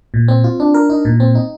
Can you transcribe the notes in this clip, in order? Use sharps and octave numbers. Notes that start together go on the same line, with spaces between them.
A#2
C4
F4
D4
A#4
D#4
A#2
C4
D#4